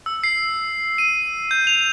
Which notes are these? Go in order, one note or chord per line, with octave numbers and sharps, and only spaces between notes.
E6
C7
D#7
G6
F7